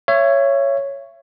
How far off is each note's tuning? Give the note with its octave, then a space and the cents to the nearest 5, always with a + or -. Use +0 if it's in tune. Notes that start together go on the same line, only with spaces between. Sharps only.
C#5 +0 E5 +30